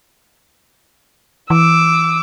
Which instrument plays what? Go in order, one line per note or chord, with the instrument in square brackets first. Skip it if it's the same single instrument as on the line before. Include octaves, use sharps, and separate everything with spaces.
[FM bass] E3 [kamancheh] D6 E6